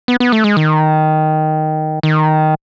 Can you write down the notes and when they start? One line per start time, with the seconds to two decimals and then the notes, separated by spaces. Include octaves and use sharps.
0.08 B3
0.20 B3
0.32 A3
0.44 G#3
0.57 D#3
2.03 D#3